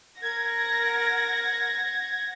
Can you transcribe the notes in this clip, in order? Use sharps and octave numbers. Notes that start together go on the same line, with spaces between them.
A#4 F#5 G#6 A#6